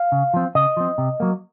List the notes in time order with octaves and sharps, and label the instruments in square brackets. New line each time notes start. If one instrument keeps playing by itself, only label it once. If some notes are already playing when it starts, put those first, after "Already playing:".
Already playing: [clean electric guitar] F5
C#3
F3 C4
C#3 D#5
F3 C4
C3
F#3 A#3